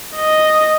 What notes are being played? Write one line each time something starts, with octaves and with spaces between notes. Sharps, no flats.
D#5